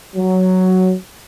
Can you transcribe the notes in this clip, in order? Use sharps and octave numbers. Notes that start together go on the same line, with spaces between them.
F#3